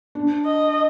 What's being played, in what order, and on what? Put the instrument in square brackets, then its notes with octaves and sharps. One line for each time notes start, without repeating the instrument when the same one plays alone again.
[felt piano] D4
[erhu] D#5